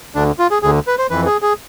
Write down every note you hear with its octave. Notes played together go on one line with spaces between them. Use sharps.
D2 D3 D4
F4
G#4
D2 D3 G#4
B4
C5
F2 E3 B4
G#4
G#4